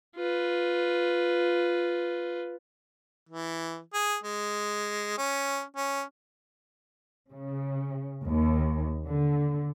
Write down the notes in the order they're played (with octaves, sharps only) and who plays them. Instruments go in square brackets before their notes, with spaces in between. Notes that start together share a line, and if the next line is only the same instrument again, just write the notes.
[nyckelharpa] F4 B4
[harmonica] E3
G#4
G#3
C#4
C#4
[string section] C#3
D#2
D3